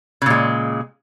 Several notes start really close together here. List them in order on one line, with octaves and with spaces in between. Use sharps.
C#3 A#2 G#3